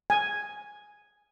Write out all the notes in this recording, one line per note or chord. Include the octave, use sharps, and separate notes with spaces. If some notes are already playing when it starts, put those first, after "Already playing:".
G#5